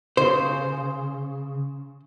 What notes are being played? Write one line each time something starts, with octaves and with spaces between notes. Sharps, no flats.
C#3 C5